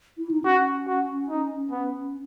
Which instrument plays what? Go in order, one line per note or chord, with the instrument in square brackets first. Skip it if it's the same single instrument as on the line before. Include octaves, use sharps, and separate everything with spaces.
[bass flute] E4
D#4
[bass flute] C#4 [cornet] F#4
[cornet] F#4
D#4
B3